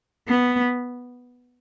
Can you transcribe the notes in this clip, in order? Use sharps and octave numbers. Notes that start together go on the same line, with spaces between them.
B3